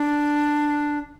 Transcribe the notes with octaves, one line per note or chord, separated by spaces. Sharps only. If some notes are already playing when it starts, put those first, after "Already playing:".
Already playing: D4